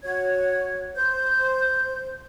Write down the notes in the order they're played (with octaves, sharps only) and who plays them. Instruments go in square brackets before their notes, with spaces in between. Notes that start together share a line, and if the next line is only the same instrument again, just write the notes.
[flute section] F#4 C#5 G#6
C5 G6